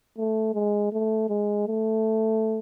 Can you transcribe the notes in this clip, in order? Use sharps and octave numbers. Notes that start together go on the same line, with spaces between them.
A3
G#3
A3
G#3
A3